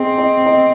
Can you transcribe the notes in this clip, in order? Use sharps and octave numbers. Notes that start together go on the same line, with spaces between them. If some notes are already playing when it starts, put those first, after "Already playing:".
Already playing: C4 G#4 D#5
D#5
D#5